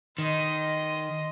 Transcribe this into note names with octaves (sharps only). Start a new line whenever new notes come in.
D#3 D#5 C6